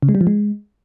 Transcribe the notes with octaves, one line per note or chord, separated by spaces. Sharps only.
C#3
G#3
G3
F3
G#3